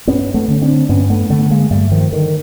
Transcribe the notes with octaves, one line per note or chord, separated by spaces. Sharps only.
G2 B3 C#4
A3 B3
D3 C#4
C4 D4
G2 B3 C#4
A3 B3
D3 A3 B3
G#3 A#3
G2 G3 A3
D#3 F3
D3 D#3